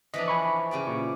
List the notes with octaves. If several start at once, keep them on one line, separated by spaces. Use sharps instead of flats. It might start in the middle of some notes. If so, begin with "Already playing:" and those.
E3 F3 D4 D#5 B6
G#5 B5 C#6
C#3 G4 D5
A#2 C#6